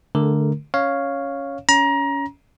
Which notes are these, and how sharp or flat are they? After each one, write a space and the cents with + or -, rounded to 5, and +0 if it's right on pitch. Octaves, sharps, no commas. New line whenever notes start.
D3 +0 A3 -20 A#4 +0
C#4 +0 C#5 +0 F5 +0
C#4 +20 A#5 +25